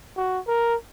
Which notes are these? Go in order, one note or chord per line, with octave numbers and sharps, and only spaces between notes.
F#4
A#4